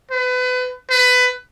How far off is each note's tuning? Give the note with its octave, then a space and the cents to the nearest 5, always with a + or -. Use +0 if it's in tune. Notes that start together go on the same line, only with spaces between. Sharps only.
B4 +30
B4 +20